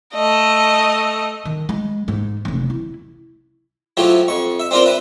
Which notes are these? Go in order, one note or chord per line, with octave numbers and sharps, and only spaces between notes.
A3 D#5
D#3
G#3
G#2
F1 C#3
E4
F3 F#3 A3 E4 G4
F2 C#6
E5
C4 D4 F4 A#4 C5
B4 E5